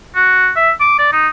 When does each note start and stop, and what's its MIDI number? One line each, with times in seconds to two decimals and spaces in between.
0.15 0.50 66
0.56 0.71 76
0.80 0.96 86
0.99 1.09 74
1.13 1.28 63